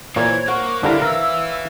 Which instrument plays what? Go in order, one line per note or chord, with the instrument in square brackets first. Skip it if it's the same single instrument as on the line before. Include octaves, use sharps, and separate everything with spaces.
[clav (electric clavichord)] A#2 [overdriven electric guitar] E3 [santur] C#5 [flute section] G#6
[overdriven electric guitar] A#3 [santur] F#5 [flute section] C#6
[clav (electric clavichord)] D3 G3 A#4 [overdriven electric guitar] D4 A4 [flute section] E4 [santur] F5
[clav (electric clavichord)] A#4 [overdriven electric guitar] B4 E5 [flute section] E6